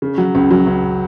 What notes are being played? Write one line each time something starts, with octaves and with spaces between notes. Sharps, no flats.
C#3
F#3
C#2
F#3
C#2